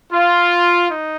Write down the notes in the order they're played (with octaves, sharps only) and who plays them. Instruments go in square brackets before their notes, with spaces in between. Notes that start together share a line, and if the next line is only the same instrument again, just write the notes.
[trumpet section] F4
D#4